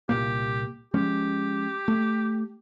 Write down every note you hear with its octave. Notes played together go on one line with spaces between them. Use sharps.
C2 A#2 A#3 G4
F3 G#3 C#4 G4
A3